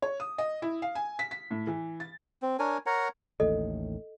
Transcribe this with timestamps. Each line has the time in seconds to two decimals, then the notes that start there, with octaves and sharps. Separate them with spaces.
0.02 C#5
0.20 D#6
0.38 D#5
0.62 E4
0.82 F5
0.95 G#5
1.19 B6
1.31 B6
1.51 A2
1.67 E3
2.00 A6
2.42 C4
2.59 D4 A#4 C#5 G#5
2.86 A#4 C#5 F#5 A#5
3.40 A1 D#2 A2 A4 D#5